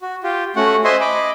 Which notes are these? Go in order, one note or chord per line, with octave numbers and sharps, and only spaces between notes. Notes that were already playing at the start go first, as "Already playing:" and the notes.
F#4
F4 G4
A3 C#4 F#4 F#5
C5 D#5 E5 G#5 C6
D#5 B5 D6